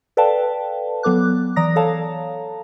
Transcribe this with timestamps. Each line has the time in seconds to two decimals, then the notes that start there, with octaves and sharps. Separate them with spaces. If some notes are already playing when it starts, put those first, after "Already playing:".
0.17 A4 B4 D5 F5 G5 A5
1.03 F#3 B3 A4 D6 F#6
1.56 E3 D5 A#5 D#6 A#6
1.76 A4 C#5 F5 A5 A#5